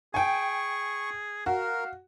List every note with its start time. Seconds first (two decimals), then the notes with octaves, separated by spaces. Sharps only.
0.14 G#4 G5 G#5 C#6
1.46 F#4 A#4 F5